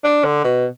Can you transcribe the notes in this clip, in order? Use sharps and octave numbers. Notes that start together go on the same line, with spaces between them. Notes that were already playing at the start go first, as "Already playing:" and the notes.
D4
D3
B2